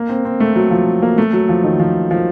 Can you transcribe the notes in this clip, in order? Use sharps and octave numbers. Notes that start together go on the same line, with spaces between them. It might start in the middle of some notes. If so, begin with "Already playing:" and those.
Already playing: A#3
C4
C4
A3
F#3
F3
A#3
A3
F#3
F3
D#3
F3
F3